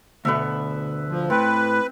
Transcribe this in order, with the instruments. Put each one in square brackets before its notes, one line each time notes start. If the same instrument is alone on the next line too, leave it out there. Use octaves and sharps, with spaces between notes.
[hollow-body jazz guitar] D2 B2 A3 [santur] B4 E5
[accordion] F3
[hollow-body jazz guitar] A2 [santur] C4 [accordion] B4